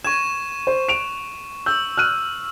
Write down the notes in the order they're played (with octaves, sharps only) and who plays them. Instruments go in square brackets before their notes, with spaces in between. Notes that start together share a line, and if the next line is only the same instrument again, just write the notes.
[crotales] C#6 E7 [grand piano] G#6
[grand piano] C5
D7 F7
[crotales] E6 [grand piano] G6
[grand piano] F6 F#6 D#7